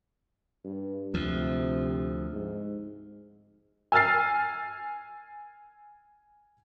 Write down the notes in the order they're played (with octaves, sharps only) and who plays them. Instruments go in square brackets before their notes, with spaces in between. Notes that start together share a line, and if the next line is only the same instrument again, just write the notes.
[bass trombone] G2
[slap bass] D2 F3 [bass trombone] C3
[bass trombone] G#2
[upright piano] G#5 E6 F6 A6 C7